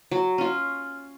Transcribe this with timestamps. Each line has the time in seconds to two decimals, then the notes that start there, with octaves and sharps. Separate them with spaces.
0.11 F#3
0.38 C#4 F4